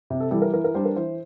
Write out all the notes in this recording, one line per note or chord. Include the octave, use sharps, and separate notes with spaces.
C3
A4
E3 G3 A4
A#4
E3 A#4
A#4
G3 D4 C5
A#4
E3 C5